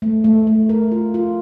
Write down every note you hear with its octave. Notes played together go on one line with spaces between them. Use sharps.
A3
A3
A3
A#4
F4
F4